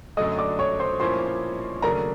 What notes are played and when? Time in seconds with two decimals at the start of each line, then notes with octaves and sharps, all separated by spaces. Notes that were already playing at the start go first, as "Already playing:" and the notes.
0.17 F#2 D3 F#3 A3 D#5 D#6
0.38 D5 D6
0.59 C#5 C#6
0.79 C5 C6
1.00 A#2 F3 A#3 C#4 E4 C5 C6
1.82 D#2 C#3 F#3 A3 D4 A#4 A#5